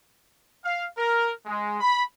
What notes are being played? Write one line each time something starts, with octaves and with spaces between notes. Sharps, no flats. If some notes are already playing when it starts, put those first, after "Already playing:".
F5
A#4
G#3
B5